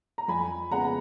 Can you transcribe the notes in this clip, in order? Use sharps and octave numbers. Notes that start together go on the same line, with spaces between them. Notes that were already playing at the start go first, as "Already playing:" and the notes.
A#5
F2 G#5 B5
C#3 G#3 B3 F#5 A#5